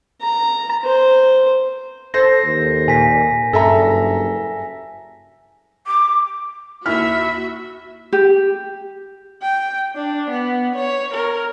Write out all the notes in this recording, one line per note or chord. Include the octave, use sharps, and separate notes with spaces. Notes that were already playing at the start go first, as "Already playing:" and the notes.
A#5
C5
A4 C5 A#6
D#2
A#2 G#5 B6
F#1 G2 A4 E5 A#5
D6
D#2 E4 F#4 E5 B5 F6
G4
G5
D4
B3
C#5
A#4